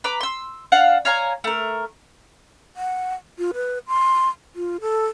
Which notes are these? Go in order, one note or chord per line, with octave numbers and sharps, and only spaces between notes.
B4 A#5 D6
C6 E6
D4 F5 F#5
C#5 F5 G#5 A#5
A3 A#4
F#5
F4
B4
C6
F4
A4